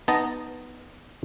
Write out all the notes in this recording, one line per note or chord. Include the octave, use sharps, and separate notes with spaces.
B3 D#4 D#5 A5 A#5